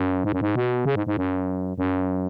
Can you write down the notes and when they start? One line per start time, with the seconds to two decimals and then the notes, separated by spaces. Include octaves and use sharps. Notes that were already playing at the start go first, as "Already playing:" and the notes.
Already playing: F#2
0.24 G#2
0.33 F#2
0.41 G#2
0.55 B2
0.85 C#3
0.95 G#2
1.07 G#2
1.17 F#2
1.78 F#2